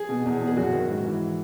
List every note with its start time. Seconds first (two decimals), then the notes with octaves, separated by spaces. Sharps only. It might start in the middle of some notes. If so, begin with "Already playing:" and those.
Already playing: G#4
0.09 B2
0.25 E2
0.41 B2
0.47 G#4
0.57 F#2 F#4
0.73 D#3
0.88 G#2
1.05 E3